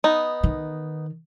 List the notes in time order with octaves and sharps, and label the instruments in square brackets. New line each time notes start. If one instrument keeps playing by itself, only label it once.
[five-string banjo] B3 D#4
[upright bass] D#3